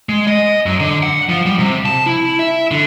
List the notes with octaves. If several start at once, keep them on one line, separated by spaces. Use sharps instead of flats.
G#3
D#5
F#2
D3
F#5
F3
G3
C3
A5
E4
E5
D3